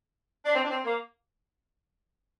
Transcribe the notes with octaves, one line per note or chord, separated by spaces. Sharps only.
D4
C4
D4
C4
A#3